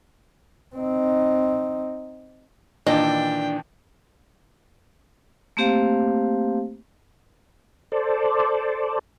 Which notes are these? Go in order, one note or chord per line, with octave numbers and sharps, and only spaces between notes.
C4 D#4
A#2 D#3 E3 D4 D#5 G5
A3 A#3 C4 G4 C5 F5
A4 C5 D5